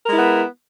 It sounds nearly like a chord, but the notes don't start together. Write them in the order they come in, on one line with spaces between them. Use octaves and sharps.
A#4 G#3 E4 B3